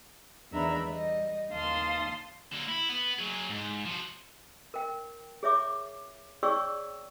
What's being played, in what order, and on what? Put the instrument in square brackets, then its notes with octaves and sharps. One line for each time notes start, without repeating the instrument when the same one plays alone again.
[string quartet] E2 D#3 D4 E5 A#5 B5
G3 D#5
D#2 D#3 F5 A5 C6 D#6
[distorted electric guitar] D3 A#3
E4
B3
F#3 G#4
G#2
F3 F#4
[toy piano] A#4 G5
G#4 C#5 E5 D6
G#4 C#5 D5 G5 C#6 E6